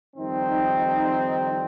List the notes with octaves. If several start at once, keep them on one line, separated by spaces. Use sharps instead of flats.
F2 D#3 G3 C4 D#4